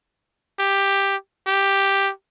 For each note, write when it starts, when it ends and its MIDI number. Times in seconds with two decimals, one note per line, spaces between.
0.59 1.16 67
1.47 2.11 67